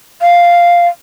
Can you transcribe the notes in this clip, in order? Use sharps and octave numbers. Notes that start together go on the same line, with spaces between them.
F5